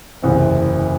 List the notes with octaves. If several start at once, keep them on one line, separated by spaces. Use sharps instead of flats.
F#1 E2 C3